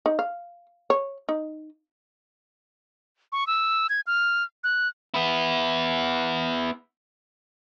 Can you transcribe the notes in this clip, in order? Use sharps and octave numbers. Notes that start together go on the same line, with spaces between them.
D#4
F5
C#5
D#4
C#6
E6
G#6
F6
F#6
B3 E4